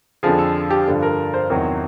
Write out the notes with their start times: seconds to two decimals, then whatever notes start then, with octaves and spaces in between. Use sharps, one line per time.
0.23 F2 D3 F3 G#4
0.39 A4
0.70 G4
0.87 G2 D3 F3
1.02 A#4
1.34 C5
1.50 E2 C3 D#3 F#3